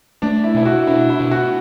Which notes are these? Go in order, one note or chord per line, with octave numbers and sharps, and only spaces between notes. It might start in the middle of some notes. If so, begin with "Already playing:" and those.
A3 D4
E4
B2 E4
F#4
D4 E4
E4
B2
F#4